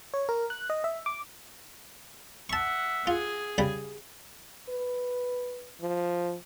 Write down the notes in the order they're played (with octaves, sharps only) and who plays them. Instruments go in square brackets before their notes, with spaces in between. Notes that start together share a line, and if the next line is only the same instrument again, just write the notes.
[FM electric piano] C#5
A#4
F#6
D#5
E5
D6
[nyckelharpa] E5 F#5 [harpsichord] A5 C#6
[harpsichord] F4 [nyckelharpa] G#4
[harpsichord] C#3 G3 B5
[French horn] B4
F3